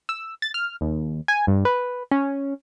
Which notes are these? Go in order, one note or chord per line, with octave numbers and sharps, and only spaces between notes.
E6
A6
F6
D#2
G#5
G2
B4
C#4